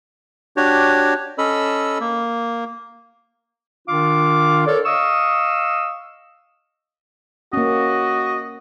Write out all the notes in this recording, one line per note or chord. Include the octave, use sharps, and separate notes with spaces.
D4 F#4 G4 C#5
C#4 A4 D#5 B5 E6
A#3
D#3 D4 F4 F5 D6
A4 A#4 C#5 D5
D#5 F5 C#6 D#6 E6
A#3 C#4 F#4 D#5